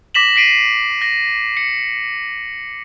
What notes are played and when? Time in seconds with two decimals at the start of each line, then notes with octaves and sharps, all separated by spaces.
0.14 D6 A#6 B6 E7 F#7
0.36 B6 C7 D7 D#7
1.01 A#6
1.57 C#7